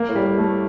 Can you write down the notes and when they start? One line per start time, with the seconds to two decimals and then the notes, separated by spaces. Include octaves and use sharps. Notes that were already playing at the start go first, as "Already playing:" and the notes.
Already playing: A#3
0.08 A2
0.15 G3
0.23 A2
0.38 A3